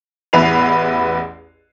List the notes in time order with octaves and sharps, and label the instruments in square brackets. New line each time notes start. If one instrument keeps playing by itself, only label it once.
[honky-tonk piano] A1 E2 E4 B4 C7 F7